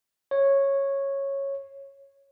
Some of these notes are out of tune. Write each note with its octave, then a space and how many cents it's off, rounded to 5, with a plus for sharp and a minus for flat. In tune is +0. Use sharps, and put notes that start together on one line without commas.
C#5 -10